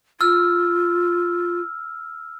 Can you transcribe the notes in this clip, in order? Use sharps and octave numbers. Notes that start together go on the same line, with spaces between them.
F4 E6 F6